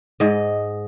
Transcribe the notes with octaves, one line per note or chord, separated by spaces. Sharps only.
G#2 D#5